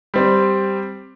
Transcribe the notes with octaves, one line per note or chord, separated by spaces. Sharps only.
G3 C4